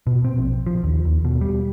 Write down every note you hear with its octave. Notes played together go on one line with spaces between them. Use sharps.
B2
C4
A#1
F3
D#2
D#2
B2
G3